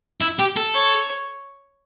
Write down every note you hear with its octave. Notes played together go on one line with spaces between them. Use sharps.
E4
G4
A4
C#5